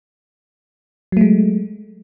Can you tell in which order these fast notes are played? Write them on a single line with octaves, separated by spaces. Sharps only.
F#3 A3 G#3